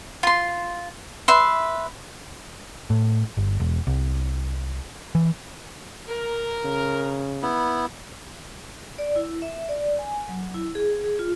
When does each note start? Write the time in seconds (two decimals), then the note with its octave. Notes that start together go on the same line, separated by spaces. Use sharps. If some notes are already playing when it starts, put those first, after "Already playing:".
0.23 F4 C6
1.28 B4 E5 C6
2.90 A2
3.37 G1
3.60 E1
3.87 C2
5.15 E3
6.08 A#4
6.65 C#3
7.42 B3 E4
8.98 D5
9.16 E4
9.42 E5
9.69 D5
9.99 G#5
10.28 F#3
10.54 E4
10.75 G#4
11.04 G#4
11.19 F4